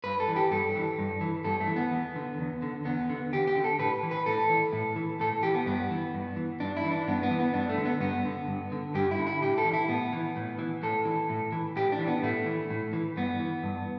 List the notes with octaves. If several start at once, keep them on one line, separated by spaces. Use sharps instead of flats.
G2 B4
A4
E3
G4
G2 A4
E3
G2
E3
G2 A4
A3
E3
B3
E2
D3
E2
D3
E2 B3
D3
E2 G4
G4
D3
A4
A2 B4
E3
B4
A2 A4
E3
A2
E3
A2 A4
E3 G4
B3
G2 B3
E3
G2
E3
G2 D4
E4
E3
D4
G2 B3
B3
E3
B3
G2 D4
A3
D3
B3
G2 B3
D3
G2
D3
G2 G4
E4
D3
E4
A2 G4
A4
E3
E4
A2 B3
E3
A2
E3
A2 A4
E3
A2
E3
A2 G4
D4
E3
B3
A2 A3
E3
A2
E3
G2 B3
E3
G2